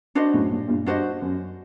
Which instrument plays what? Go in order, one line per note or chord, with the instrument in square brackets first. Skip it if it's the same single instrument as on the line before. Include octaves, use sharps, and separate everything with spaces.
[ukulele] D4 F#4 C5 D#5
[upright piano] F#2 A2
G2 A#2
G2 A#2
[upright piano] G2 [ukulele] D4 F#4 C5 D#5
[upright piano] F#2